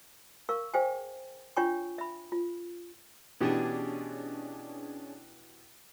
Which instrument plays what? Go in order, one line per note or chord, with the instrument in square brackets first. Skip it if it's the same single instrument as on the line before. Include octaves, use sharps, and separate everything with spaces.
[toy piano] A#4 F5 C#6
G#4 C5 F5 G5 G#5
D4 F4 C#5 G5 G#5 C#6
E5 B5
F4
[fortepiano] B2 E3 G4 [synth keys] C#4 D4 G#4